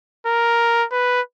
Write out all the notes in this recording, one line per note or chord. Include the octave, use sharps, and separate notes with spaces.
A#4
B4